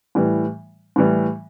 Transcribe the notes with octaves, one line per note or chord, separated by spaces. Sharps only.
A2 E3 G3
A2 E3 G3